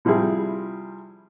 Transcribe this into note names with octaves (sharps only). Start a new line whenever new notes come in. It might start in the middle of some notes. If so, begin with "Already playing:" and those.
C3 F3 G3 E4 G#4